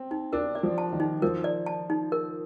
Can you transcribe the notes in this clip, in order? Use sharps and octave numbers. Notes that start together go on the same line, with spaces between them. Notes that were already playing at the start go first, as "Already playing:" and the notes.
Already playing: C4
D#4
D4 A#4
D5
F3
A5
D#3
D#4
F3 A#4
D5
A5
D#4
A#4